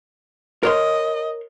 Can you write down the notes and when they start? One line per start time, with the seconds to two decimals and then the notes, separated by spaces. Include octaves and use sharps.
0.63 A#4 C#5 D#5 C6